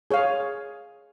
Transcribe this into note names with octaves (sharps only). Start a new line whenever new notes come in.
G#4 C#5 F5